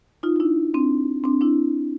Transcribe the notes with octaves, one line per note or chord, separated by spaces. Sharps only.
D#4 F4
F4
D4 E4
C4 D4
C4 D4
D4 E4